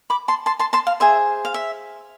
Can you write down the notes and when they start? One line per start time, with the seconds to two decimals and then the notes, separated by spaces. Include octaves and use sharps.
0.10 B5 D6
0.28 A5 C6
0.46 A5 C6
0.59 A5 C6
0.73 A5 C6
0.87 F5
1.00 G#4 C5 E5
1.45 F5
1.54 E5